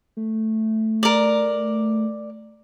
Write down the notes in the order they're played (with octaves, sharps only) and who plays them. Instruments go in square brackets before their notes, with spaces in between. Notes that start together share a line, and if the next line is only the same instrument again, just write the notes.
[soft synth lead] A3
[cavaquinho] A#4 D5